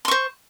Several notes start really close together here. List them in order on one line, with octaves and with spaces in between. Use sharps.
C6 C#6 C5